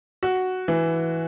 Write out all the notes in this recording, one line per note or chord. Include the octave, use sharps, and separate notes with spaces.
F#4
E3